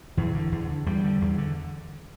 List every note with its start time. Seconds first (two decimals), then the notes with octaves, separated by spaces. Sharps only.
0.17 E2 E3
0.35 D3
0.52 E2
0.69 D3
0.86 E2 G3
1.04 D3
1.21 E2
1.38 D3